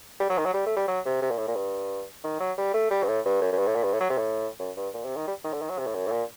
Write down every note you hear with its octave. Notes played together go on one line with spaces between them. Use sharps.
G3
F#3
D#3
F#3
G3
A3
G3
F#3
C3
C3
A#2
A2
A#2
G2
D#3
F#3
G3
A3
G3
G2
A2
G2
F#2
F#2
G2
A2
A#2
G2
A2
F#3
C3
A2
F#2
G2
A#2
C3
D#3
G3
D#3
D3
D#3
F#3
C3
A2
F#2
A2
A#2